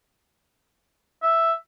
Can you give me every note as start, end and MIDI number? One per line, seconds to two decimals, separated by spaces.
1.23 1.53 76